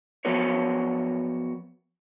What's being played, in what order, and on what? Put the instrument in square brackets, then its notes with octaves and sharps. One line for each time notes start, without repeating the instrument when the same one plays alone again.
[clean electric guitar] F3 F#3 B3 F#4 A#4 C#5